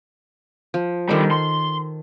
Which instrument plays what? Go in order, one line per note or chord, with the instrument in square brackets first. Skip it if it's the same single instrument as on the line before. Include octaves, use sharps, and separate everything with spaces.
[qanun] F3
[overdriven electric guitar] D3 G3 [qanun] D#3 A4
[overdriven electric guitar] C6